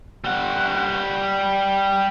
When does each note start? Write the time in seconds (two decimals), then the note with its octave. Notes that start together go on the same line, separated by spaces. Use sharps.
0.24 G3 F#5